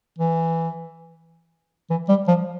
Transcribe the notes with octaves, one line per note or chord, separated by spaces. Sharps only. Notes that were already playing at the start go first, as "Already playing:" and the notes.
E3
E3
G3
F3